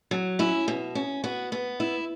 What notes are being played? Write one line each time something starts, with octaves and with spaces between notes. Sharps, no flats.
F#3
C#4 E4
B2
C#4
B3 F#4
B3
E4